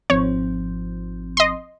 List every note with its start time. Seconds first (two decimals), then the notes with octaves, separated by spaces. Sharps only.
0.10 G#1 F3 C4 C#5
1.37 D#5 C6